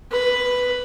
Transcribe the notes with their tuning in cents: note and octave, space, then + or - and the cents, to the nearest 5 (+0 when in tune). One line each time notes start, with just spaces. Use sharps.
B4 +5